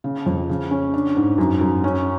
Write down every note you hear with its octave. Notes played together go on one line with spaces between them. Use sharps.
C#3
F2
C#3
C#4
D4
G#2
F#2
F#2
C#4